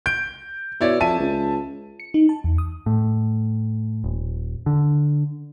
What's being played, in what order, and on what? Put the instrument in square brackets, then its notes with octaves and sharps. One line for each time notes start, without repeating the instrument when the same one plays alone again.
[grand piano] G6 D7
[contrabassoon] B2 [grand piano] E4 C#5 D5
[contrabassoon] F2 [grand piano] E5 A5 D#7
[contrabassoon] C#2
[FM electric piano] C#7
D#4
A5
E2
D#6
[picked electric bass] A2
D#1
D3